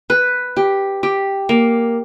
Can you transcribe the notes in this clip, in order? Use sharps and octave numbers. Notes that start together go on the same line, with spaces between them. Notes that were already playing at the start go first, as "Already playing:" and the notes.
B4
G4
G4
A#3